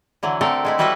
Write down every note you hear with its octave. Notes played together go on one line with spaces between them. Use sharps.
D3 E3 F#3
D3 A3 C4 A4 A#4
G#3 A3 E4
E3 G3 E4 F#4 A4 B4